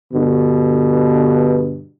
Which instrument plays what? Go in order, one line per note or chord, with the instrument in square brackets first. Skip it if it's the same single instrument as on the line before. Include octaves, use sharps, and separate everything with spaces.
[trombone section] G2 B2 D3